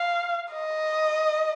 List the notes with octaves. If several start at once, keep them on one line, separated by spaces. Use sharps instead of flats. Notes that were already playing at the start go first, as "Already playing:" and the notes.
Already playing: F5
D#5